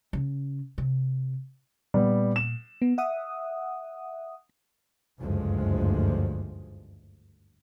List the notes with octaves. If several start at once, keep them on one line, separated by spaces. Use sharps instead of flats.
C#3
C3
A#2 G3 B3
E7
B3
E5 F#5 D#6
F#1 D2 G2 F3 G#3